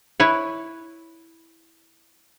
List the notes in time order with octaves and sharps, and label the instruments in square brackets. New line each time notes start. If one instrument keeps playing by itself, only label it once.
[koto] E4 B4 C#5